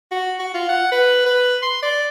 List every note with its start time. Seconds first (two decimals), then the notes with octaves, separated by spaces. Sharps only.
0.11 F#4
0.40 F#4
0.54 F4
0.69 F#5
0.92 B4
1.26 B4
1.62 C6
1.83 D5